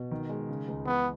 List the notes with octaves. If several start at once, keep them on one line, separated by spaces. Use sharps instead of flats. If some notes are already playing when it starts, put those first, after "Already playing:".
Already playing: B2
D#3
G#3
C#3
C#2
E3 B3